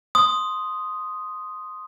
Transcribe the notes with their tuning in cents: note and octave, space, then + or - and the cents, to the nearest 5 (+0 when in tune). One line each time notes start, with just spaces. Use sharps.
C6 +0 D#6 +0